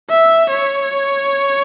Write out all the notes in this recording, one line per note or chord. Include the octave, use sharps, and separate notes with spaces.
E5
C#5